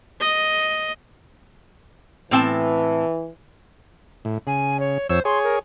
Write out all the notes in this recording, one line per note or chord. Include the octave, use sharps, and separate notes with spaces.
D#5
A2 E3 C4 A5
A2
C#3 G#5
C#5
F2 C5 C#5 E6
G#4 C#5 C6
A#4